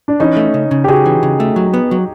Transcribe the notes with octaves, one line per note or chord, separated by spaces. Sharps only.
D4
E3 C#4 D#4
A3
C#3
C#3
G4
C#3 F#4 G#4
E3
C#3
A3
F#3
B3
F#3